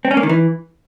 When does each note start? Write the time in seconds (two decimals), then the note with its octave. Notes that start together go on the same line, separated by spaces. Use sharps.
0.05 C4
0.11 C#4
0.17 A#3
0.23 D#3
0.29 E3